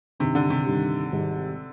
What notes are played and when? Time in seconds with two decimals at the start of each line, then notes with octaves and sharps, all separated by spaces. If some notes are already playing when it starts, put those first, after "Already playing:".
0.20 G2 C3 D#3 G3
0.35 D3
0.50 C3
0.66 G2 D#3 G3
1.12 G#1 G#2 G3